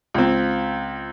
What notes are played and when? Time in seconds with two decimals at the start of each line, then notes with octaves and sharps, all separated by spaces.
0.14 C#2 C4